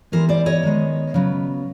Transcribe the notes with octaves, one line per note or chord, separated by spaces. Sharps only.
E3 G3 B3 A#4 C5
C5 D5
C#5 D#5
D#3 G#3 B3
C#3 F#3 B3